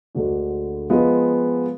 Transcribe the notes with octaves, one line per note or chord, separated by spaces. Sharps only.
D2 D3 G#3 D4 F#4
F3 G#3 B3 F4 B4